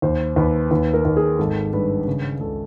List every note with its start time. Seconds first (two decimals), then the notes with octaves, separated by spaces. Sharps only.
0.02 D#2 C5
0.36 D#2 B4
0.71 D#2 B4
0.94 A#4
1.05 D#2
1.17 G#4
1.39 G#1 A4
1.73 G2 B4
2.07 C#3
2.40 C#2 A4